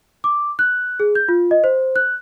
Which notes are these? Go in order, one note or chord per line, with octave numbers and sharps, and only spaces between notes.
D6
F#6
G#4
G6
F4
D#5
C5
F#6